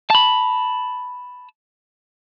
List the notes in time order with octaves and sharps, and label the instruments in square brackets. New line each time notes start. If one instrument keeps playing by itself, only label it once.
[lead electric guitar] A5 B5